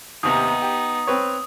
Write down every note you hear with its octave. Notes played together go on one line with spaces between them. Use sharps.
D#2 C3 B3 D#4 D#6
G4
C4 B4 C#5